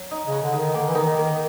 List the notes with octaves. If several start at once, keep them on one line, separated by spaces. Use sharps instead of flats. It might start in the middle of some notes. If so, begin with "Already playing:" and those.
Already playing: F#3
D#4
C#3
F#4
D3
D#4
D#3
D3 A#3
E3
D#3 D#4
D#3 A#3